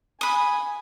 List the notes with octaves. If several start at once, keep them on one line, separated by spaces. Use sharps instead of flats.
G#5 B5 D#6